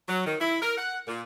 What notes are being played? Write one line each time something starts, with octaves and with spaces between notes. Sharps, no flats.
F#3
D#3
E4
A#4
F#5
A#2